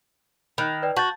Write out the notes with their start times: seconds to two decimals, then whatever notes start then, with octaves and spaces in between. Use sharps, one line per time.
0.58 D#3 B5 F#6
0.82 B4 D5 G5
0.97 F#4 A5 G6 A6